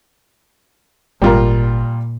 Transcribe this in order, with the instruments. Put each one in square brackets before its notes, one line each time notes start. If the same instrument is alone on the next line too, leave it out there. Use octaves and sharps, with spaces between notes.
[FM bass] G#1 [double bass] A#2 [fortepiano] G3 F4 A#4